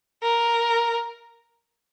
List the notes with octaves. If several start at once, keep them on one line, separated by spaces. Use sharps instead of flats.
A#4